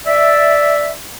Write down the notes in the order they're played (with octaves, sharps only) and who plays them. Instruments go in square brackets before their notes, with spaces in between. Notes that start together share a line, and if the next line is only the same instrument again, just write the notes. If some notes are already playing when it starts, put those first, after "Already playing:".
[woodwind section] D5 E5